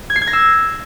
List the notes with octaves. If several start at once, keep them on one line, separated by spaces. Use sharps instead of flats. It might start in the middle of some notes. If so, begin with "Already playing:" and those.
G#6
C7
G#6
A#6
E6